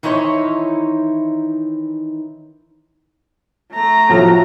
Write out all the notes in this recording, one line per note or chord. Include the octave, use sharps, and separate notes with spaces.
D#3 E3 D#4 E4 C5 C#5
A3 A#5
A2 F3 F#3